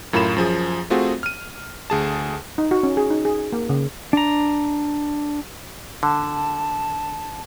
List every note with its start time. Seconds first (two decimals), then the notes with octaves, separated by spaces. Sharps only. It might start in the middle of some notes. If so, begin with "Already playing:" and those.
0.13 F#2 A2 F4 A#4 B5 E7
0.36 F#2 F3 G#4
0.90 A3 C4 F4 F#4 G#4
1.23 F6 D#7
1.90 D2 G#4 A5
2.58 D#4
2.71 F#4
2.83 C#4
2.97 G#4
3.10 D#4
3.25 G#4
3.52 A#3
3.69 C#3
4.13 D4 A#5
6.03 D3 A5